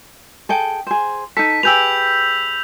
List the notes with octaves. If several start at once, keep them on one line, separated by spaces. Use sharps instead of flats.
G#4 A4 G5
G#4 C5
D#4 A4 B6
G4 G#4 B4 E6 G6 F7